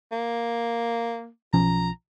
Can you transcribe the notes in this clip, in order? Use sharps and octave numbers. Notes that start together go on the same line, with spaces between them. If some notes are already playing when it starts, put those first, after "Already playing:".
A#3
B1 F3 C#4 A#5